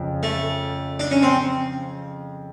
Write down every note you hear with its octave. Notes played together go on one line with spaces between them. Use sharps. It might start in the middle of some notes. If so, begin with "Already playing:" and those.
Already playing: F2 C#3
A3
D4
C#4
C4